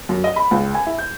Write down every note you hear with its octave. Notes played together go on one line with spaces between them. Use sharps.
F#2
D#5
B5
C#2
G#5
E4
G6